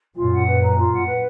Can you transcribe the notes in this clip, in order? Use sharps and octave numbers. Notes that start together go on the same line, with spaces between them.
F#2 A#2 F4
F#5
B4
A#5
F4
F#5
B4